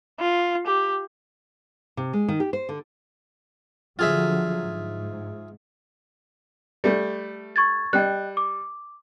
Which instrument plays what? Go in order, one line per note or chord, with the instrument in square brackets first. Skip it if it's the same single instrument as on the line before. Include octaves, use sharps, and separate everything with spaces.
[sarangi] F4
G4
[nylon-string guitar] C3
G#3
D#3
G4
C5
D3
[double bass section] D3 F3 F#3 [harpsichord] F4 G#4 E5
[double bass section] G#2
[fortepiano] G3 A3
[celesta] C#6 G#6 A6
[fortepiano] G3 [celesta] D#5 G5 F#6
[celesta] D6